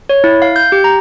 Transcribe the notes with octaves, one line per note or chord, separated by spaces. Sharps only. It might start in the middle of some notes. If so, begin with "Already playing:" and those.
C#5
E4
F5
G6
G4
A#5